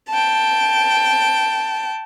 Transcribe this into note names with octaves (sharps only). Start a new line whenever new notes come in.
G5 A5